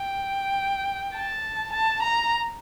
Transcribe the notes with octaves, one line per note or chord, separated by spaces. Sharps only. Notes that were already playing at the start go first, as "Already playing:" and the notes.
Already playing: G5
A5
A5
A#5